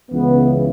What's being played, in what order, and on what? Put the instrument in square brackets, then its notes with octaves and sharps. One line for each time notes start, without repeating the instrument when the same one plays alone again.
[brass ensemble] C#2 C#3 E3 B3